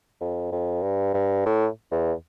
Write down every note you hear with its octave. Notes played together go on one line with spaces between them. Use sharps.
F2
F2
G2
G2
A2
E2